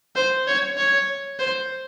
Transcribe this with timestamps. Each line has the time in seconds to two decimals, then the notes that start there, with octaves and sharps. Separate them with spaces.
0.16 C5
0.47 C#5
0.77 C#5
1.39 C5